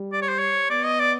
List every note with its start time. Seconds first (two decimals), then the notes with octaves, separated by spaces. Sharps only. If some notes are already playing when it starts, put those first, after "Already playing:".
Already playing: G3
0.13 D5
0.22 C#5
0.29 C5
0.39 C#5
0.70 B3 D5
0.85 D#5
1.00 D5